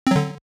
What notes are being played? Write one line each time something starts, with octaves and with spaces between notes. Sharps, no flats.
D3 F#3 C4